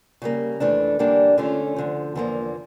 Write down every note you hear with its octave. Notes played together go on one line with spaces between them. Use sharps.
C#3 G3 A#3
F2 E3 A3 D4
E2 D3 G3 A#3 D4
D3 A3 C#4 F4
D2 D3 F3
E2 D3 F3 A#3